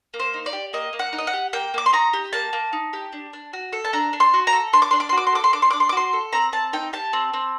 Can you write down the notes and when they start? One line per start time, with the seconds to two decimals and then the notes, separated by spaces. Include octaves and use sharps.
0.14 A#3
0.19 C5
0.34 D#4
0.46 D5
0.53 G4
0.73 A#3 D#5
0.93 A#3
0.99 F#5
1.13 D#4
1.18 D#5
1.27 F#5
1.33 G4
1.53 A#3 G5
1.74 A#3 D6
1.86 C6
1.93 D#4 A#5
2.13 G4
2.33 A#3 A5
2.53 A#3
2.73 D#4
2.93 G4
3.13 D4
3.33 D4
3.53 F#4
3.73 A4
3.85 A5
3.93 D4 A#5
4.13 D4
4.20 C6
4.34 F#4
4.47 A#5
4.52 A4
4.73 D4 C6
4.82 D6
4.91 D4 C6
5.00 D6
5.09 C6
5.12 F#4
5.17 D6
5.27 C6
5.32 A4 D6
5.44 C6
5.53 D4 D6
5.62 C6
5.71 D4 D6
5.80 C6
5.89 D6
5.92 F#4 C6
6.13 A4
6.33 C4 A#5
6.52 C4 A5
6.73 D#4 G5
6.93 G4 A5
7.13 C4
7.33 C4